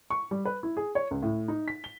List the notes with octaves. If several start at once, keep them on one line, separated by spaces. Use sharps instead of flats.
C#6
G3
B4
E4
G#4
C#5
C#2
A2
D#4
B6
G7